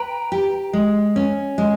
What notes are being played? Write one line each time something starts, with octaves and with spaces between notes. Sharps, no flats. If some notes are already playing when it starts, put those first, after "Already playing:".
Already playing: B4 G5 A#5
G4
G#3
C#4
G#3